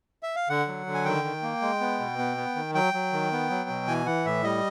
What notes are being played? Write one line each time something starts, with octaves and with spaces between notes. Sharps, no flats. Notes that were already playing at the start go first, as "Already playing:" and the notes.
E5
F5
D3 F#5
F#3
D3
G#5
D#3 G5
D#3
A#3
G#3
B3
B2
B3
B3
D#3
F#3 G5
F#3
D#3
B3
F#3
B2
E3 G#5
E3 F#5
A2 E5
G3 D#5